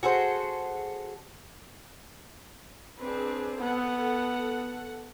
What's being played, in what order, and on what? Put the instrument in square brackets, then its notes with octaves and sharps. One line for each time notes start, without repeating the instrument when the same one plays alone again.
[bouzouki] F#4 G#4 A4 C5
[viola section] C4 D4 G#4 [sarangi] B4
[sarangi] B3 [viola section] A4 F#5